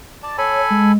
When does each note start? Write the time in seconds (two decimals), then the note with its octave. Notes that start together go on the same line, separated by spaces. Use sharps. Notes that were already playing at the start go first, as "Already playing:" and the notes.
0.23 D5 A5
0.38 A4 C#5 G#5 B5
0.70 G#3